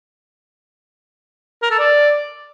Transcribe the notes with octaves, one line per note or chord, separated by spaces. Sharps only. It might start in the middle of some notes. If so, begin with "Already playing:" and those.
A#4
A4
D5